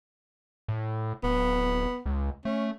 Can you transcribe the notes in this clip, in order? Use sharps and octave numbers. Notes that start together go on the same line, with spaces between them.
A2
D1 B3
C#2
A3 C#4